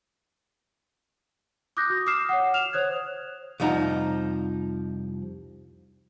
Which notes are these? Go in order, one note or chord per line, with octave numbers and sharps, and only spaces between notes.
D6 D#6 F#6 G6 A#6
F#4
D6 D#6 F6 C7 E7
C#5 F#5
F6 E7 F7
C5 C#5 D#6 F#6 G#6
C2 F2 F3 D#4 F#5 A#5